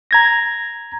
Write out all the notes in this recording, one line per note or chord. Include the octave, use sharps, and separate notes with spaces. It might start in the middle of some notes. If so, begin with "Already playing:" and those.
A#5 G#6 A#6